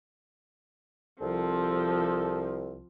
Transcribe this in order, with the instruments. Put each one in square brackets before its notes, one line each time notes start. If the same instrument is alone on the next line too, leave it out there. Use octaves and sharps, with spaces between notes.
[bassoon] C2 [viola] F3 C4 [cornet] A4